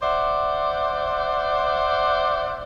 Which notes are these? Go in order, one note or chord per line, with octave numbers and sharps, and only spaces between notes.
C5 D5 E5 F#5